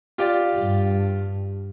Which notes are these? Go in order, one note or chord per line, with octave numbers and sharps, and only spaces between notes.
F4 G4 D5
G2